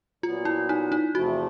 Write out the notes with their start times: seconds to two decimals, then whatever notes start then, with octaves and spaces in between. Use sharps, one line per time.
0.23 A#2 F#3 B3 F4
0.45 E4
0.69 D#4
0.92 D#4
1.14 E2 C3 F3 A3 F#4